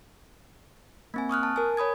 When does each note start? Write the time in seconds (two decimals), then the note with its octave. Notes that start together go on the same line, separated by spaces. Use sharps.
1.14 A#3 C4 G#5
1.29 C#6 D#6 F6 F#6
1.43 A5
1.56 A#4 G#5
1.77 C#5 B5 D#6 G#6